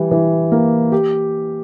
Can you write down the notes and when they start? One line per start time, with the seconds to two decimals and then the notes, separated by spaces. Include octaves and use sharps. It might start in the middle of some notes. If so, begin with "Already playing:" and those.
Already playing: E3 G3
0.11 E3
0.52 A#3
0.92 G4